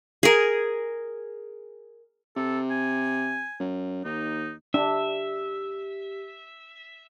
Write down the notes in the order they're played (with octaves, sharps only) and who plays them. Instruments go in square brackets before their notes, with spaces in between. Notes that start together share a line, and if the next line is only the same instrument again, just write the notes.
[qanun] G#4 A#4
[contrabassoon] C3 [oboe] A4
[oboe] G#5
[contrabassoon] F#2
[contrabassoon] D#2 [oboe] D#4
[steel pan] D4 [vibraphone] G4 [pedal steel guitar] E5